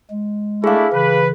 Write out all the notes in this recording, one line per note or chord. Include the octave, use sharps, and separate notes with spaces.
G#3
A3 D4 E4 G#4 F5
C#3 E3 B4